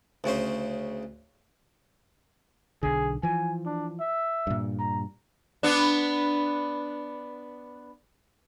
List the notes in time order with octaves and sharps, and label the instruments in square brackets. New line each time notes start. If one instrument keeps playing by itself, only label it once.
[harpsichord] D2 C#3 C#4 C5
[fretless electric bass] B1 D3 [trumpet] G#4
[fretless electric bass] E3 F3 [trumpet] G#5
[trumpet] D4
E5
[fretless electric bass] G2 A#2
[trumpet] A#5
[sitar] B3 D4